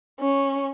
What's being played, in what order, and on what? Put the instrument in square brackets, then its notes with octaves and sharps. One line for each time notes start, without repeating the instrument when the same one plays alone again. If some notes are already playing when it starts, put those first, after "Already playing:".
[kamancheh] C#4